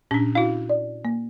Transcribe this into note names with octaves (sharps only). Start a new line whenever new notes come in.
A#2 C#4 D4
E4 F#4 F5
D5
A#3